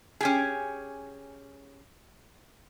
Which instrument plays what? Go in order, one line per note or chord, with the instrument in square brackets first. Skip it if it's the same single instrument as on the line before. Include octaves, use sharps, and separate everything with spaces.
[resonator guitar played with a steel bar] C#4 G4 G#4